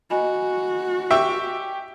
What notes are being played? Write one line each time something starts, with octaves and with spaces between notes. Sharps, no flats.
F#4 D#5 G#5 B5
G4 E5 G5 C#6